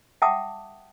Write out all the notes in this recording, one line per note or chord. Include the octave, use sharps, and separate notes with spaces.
E5 F#5 G5 A5 D6 D#6